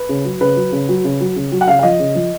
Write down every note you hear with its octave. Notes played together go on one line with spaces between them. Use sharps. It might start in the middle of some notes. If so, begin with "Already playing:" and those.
Already playing: B4
C#3
F#3
C#3 B4
F#3
C#3
F#3
C#3
F#3
C#3
F#3
F#5
C#3 F5
F5
F3 D#5
C#3
F3